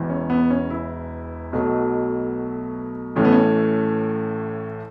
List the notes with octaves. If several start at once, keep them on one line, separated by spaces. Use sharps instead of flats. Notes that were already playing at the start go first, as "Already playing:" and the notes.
Already playing: E1 E2 E3
C#4
B3
C#4
E4
B1 B2 F#3 A3
A1 A2 E3 A3 C#4
B3
C#4